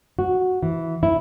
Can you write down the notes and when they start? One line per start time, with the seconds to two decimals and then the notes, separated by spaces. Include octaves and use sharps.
0.19 F#4
0.63 E3
1.03 E4